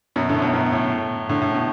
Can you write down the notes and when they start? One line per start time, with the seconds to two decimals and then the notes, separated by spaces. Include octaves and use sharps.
0.16 F#2 B2
0.29 A2 D3
0.42 F#2 B2
0.53 F#2 B2
0.72 A2
1.29 A2 D3
1.41 A2
1.55 B2